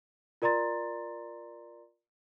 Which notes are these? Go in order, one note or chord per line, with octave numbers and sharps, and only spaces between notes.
F4 A#4 D5 A#5 C6 A6